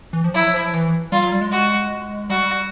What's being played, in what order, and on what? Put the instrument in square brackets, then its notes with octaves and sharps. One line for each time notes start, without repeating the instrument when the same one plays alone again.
[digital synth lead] E3
F3
[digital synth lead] F#3 [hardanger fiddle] E4
[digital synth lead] F3
E3
[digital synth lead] G3 [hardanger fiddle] F4
[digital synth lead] F#3
G3
G#3
[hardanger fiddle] F#4
[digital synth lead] G3 [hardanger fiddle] F#4